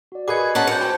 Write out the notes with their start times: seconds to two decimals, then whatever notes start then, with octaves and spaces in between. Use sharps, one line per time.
0.12 F#4 D5
0.28 G#4 A#4 B4 D#5 D6 G#6 C#7
0.55 C#4 F#5 A5 A#5
0.67 F#2 D6 G6 C#7
0.81 C5 G5 A5